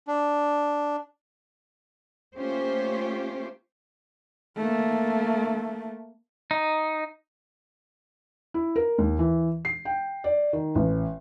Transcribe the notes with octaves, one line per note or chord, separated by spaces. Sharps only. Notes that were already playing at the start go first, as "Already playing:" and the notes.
D4
A3 A#3 C#4 F4 G4 C5
A3 A#3
D#4
E4
A#4
D#2
E3
C7
G5
D5
D#3
A1